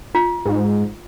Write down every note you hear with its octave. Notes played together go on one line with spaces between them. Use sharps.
F4
G#2